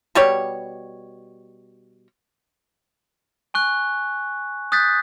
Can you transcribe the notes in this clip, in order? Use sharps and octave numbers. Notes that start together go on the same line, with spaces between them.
B2 G3 G4 C#5
G#5 C#6 F#6
D#6 F#6 G6 A6 B6